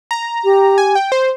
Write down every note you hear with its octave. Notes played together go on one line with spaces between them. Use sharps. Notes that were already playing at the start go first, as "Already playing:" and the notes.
A#5
G4
G#5
G5
C5